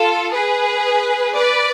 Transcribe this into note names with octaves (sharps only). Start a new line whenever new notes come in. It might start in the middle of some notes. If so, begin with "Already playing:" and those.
Already playing: F4 A4
G#4 B4
B4 D5